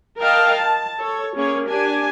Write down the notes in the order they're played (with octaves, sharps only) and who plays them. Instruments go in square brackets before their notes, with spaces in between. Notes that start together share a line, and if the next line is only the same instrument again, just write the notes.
[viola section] A#4 D#5 F5 G5 A5
A5
A4 C#5
A#3 C#4 G#4 C#5
D4 G4 G#5